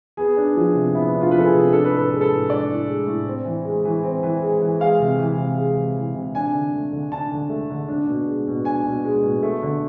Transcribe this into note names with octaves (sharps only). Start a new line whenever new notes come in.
B3 G#4
D4
F3 G#4
C3
B3 E4
D4
F4
F3 B4
A4
G#4
C3
D4 A4
B4
A2
A4
G#3 B4
A4
A2
D4 D5
A2
G#3
A2
C4
E3
G#3
E3
C4
E3
G#3
E3
G#3 F5
C3
E3
C3
G#3
C3
E3
C3
D4 G#5
D3
A3
D3
D4 A5
D3
A3
D3
D4
B2
G#3
B2
D4 G#5
B2
G#3
B2
A3
D3